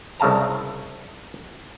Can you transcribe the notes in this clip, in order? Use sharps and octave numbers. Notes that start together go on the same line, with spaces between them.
C2 C#3 F5 A5 A#5